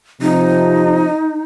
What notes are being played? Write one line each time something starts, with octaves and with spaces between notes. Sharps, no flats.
C3 F3 D#4